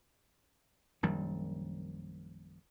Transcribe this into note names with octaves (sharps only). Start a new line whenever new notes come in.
A#1 F#2 D#3 G3